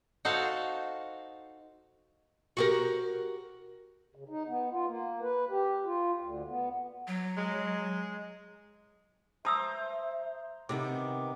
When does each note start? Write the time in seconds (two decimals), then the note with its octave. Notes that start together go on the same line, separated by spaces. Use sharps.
0.25 D#4 F#4 A4 C5 F5
2.57 F#4 G4 A#4
4.15 C#3
4.29 D#4
4.48 B3
4.72 F4
4.86 A#3
5.22 B4
5.50 G4
5.85 F4
6.20 D2
6.48 B3
7.07 F#3
7.37 G#3
9.45 C5 E5 A5 A#5 D#6 E6
10.69 C3 D#3 B3 F#5 D6